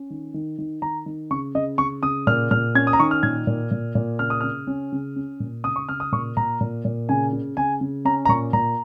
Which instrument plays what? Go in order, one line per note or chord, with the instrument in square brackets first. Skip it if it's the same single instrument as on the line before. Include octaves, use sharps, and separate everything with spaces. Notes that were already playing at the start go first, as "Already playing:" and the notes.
Already playing: [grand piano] C#4
D#3
D#3
D#3
D#3 A#5
D#3
C#3 C#6
C#3 D#5
C#3 C#6
C#3 D#6
A#2 F6
A#2 F6
C#4 G#6
D#6
A#5
D#3 C#6
F6
A#2 G#6
A#2
A#2
A#2
C#3 F6
D#6
C#3 F6
C#4
C#3
C#4
A#2
C#3 D#6
C#6
C#3 F6
D#6
A#2 C#6
A#2 A#5
A#2
A#2
C#3 G#5
C#3
C#3 G#5
C#3
C#4 A#5
A#5
A#2 C#6
A#2 A#5